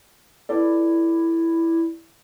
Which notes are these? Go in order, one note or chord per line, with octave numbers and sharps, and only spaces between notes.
E4 A4 B4 D5